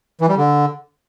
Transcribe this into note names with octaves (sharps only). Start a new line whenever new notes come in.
E3
G3
D3